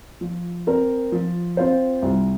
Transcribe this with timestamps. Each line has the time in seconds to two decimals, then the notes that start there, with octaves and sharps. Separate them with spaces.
0.21 F3
0.67 C4 A#4
1.12 F3
1.57 C4 F4 C5
2.02 C2